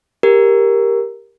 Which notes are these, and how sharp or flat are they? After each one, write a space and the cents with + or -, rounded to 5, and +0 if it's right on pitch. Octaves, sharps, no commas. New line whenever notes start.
G4 +10 A#4 +0